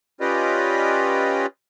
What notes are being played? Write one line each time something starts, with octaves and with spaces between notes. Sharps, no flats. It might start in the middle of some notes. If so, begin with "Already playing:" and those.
C#4 F4 G4 B4 D5 D#5